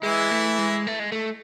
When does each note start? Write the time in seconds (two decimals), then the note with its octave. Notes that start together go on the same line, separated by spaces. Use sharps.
0.02 E3 G#3 E4
0.31 A3
0.58 G#3
0.87 A3
0.99 G#3
1.12 A3